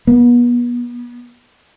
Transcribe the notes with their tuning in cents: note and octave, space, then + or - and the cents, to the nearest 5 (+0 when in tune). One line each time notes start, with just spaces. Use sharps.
B3 -35